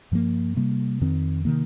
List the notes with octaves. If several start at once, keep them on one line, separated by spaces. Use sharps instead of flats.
G2 F3 A#3
C3 G3 A#3
F2 D#3 C4
C3 D#3 A#3